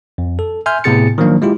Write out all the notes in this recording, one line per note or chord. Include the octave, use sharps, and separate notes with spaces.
F2
A4
E5 G#5 C6 F6 G6
A2 C3 B3 G#4 A6 C#7
D#3 F3 F#3 A#3 D4
G#3 E4 F4 G4